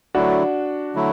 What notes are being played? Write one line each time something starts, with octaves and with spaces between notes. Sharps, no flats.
D3 F#3 A3 D4 E4 F#4
D3 F#3 A3 E4